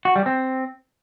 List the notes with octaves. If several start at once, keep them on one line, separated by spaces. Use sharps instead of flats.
F#4
G3
C4